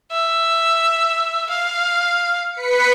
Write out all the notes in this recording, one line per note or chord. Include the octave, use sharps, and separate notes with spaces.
E5
F5
B4 B6 C#7